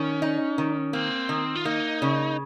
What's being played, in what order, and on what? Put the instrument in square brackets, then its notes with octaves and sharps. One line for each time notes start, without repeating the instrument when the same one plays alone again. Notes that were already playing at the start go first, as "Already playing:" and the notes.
Already playing: [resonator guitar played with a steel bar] D#3 [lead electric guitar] C#4
[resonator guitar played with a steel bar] D#4
D#3
[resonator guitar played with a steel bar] A#3 [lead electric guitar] C4
[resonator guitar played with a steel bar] D#3
[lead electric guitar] F4
[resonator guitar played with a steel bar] A#3 [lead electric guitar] D#4
[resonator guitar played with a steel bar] C#3